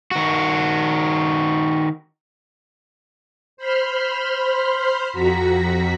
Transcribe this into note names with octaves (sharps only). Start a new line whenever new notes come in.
D#3 F#4
C5 B5 C6 F6
F2 F#4 A#5 B6